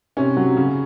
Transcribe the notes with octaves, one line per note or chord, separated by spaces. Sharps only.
C3 C#4
F#3
C#3